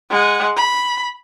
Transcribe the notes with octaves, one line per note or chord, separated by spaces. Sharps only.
G#3 F#5
B5